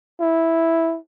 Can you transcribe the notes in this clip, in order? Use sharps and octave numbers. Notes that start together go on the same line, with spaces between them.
E4